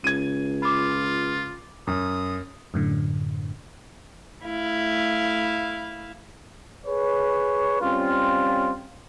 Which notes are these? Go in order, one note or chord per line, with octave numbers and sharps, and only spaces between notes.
C#2 G#6 D#7
F4 B5 D6
F#2 D#6
F#2 A2 D3
A3 E4 F5
G#4 B4 C#5
G3 C4 C#4 F4